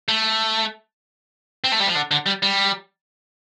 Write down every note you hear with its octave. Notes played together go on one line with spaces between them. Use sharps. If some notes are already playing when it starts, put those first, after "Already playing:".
A3
C4
A3
G3
F3
D3
D3
G3
G3